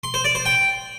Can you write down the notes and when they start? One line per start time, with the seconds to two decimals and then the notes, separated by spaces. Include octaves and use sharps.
0.04 C6
0.14 C5
0.24 D5
0.35 C5
0.45 G5